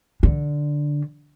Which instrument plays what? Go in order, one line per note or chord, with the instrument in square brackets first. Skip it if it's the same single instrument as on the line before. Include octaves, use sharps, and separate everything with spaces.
[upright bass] D3